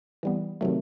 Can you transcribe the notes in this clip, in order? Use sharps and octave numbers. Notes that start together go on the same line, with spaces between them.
E3 G3 B3
C3 D#3 F#3 A3